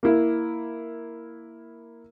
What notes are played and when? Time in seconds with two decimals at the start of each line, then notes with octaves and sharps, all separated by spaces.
0.03 A#3 E4